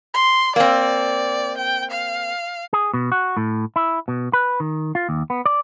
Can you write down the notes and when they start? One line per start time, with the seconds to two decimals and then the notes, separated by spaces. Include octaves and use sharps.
0.14 C6
0.56 A#3 C4 D5
1.58 G5
1.91 F5
2.73 G#4
2.94 B2
3.12 F#4
3.37 A2
3.76 E4
4.08 B2
4.33 B4
4.60 D#3
4.95 F4
5.09 D#2
5.30 B3
5.46 D5